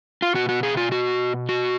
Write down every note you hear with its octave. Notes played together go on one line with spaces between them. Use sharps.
F4
B2 F#4
F#4
G#4
F4
F#4
F#4